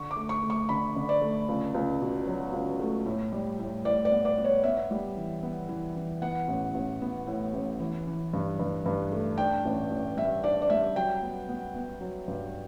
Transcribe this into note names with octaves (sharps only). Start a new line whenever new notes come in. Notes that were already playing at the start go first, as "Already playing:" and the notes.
Already playing: D3 C#6
D6
A3
C#6
A3
C#6
D3 B5
D3
D5
A3
C#2
C#2
B2
F#3
C#2
A3
A2
G3
A2
A2 D5
D5
B3
D5
B3
C#5
B3 E5
G3
E3
B3
E3
E3
B3 F#5
A1
A1
B3
A2
A1
E3
E3
G2
G2
G2
A3
D4 G5
A1
A1
G3 E5
D4 D5
D5
G3 E5
F#3 G5
B3
B3
B3
F#3
G2